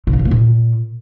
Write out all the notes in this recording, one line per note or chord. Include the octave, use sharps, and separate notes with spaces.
C3
B2
C#3
A#3
A#2